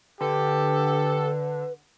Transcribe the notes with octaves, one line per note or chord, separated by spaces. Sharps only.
D3 G4 A4 B4